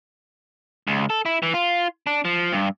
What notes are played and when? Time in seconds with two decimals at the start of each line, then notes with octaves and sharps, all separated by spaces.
0.87 C#2
1.10 A4
1.25 E4
1.43 E3
1.54 F4
2.07 D4
2.25 F3
2.53 G2